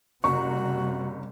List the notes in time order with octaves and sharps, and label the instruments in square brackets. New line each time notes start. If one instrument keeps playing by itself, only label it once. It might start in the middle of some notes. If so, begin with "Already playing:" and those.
[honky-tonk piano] F#1 A#5 [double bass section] C3 G3 [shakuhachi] F#4 [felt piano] C#6